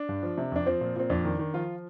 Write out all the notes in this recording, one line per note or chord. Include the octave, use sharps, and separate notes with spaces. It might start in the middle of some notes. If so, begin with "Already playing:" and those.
Already playing: D4
G2
F3
C3
F2 D4
F3 C4
A#2
A#2 C4
F2 D4
D#3
D#3
F3 F4